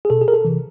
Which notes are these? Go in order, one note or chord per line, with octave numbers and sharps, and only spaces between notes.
G#4
B2 A4
G#4
A#4
A4
C3 E3